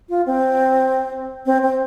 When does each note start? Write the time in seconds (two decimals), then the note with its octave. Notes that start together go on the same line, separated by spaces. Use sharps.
0.09 F4
0.26 C4
1.46 C4
1.63 C4